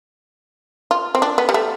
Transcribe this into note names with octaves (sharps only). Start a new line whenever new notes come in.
F4
C4
D4
B3
G3
A3